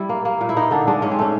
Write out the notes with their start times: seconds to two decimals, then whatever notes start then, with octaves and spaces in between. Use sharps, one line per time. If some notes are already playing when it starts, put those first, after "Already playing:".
Already playing: G3 E4
0.09 A#3
0.25 A#3
0.41 A#2
0.49 E4
0.56 A#3 D#4
0.71 D3 D4
0.87 G#3 D4
1.02 G#2 C#4
1.11 C4
1.19 A3 C#4